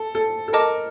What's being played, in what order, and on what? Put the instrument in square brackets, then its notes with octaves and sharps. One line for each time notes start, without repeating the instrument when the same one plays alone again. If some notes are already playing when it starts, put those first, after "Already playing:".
Already playing: [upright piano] A4
A4
A4
[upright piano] A#4 [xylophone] D#5 A5 D6